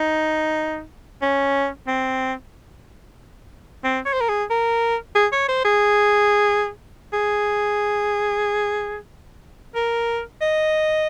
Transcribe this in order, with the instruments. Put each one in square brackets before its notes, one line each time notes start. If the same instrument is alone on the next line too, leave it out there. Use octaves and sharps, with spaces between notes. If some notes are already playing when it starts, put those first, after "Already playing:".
Already playing: [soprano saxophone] D#4
C#4
C4
C4
C#5
C5
A#4
G#4
A#4
G#4
C#5
C5
G#4
G#4
A#4
D#5